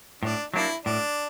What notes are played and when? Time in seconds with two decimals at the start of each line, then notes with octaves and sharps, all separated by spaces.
0.22 A2 D4
0.53 F#3 A#3 D4 E4
0.85 A2 D4